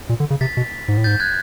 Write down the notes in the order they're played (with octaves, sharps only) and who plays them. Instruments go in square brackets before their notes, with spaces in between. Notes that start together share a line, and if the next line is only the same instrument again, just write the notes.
[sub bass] A#2
D3
C#3
[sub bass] C3 [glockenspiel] A6 B6
[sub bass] B2
G#2
A2
[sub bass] G#2 [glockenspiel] G6 A6
[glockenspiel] F#6 G#6